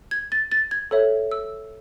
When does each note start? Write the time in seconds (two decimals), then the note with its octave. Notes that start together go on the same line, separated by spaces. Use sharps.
0.11 G#6
0.32 A6
0.52 A6
0.71 G#6
0.91 A4 C#5 E5
1.31 E6